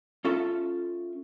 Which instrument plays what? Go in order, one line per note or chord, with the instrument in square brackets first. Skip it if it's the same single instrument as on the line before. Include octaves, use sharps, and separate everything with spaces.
[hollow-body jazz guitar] C#4 F4 A4 E5